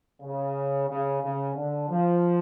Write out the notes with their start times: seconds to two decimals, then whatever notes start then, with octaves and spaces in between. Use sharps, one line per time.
0.22 C#3
0.89 C#3
1.22 C#3
1.55 D3
1.89 F3